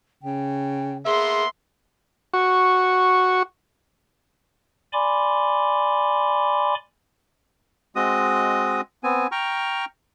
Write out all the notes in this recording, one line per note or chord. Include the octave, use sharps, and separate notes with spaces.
C#3 G5
A#3 B3 G#4 E5 C6
F#4 C#6
D5 G#5 B5 C6 D6
G#3 C4 F#4 D#5 D#6
B3 C4 G#5
G5 A#5 C#6 F6